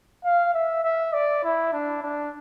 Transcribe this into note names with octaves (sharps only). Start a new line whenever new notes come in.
F5
E5
E5
D5
E4
D4
D4